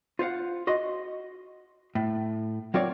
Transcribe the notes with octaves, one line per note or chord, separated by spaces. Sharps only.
F4 C5 F5 F#5
F#4 D#5 C6
A2
F#3 C4 F4 A#4 C#5 D5